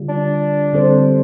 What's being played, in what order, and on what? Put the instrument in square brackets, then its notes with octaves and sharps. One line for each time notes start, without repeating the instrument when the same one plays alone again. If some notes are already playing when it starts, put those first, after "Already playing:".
Already playing: [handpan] D3 G3 F4
[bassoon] D4
[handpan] D3 G3 C4 A4 C5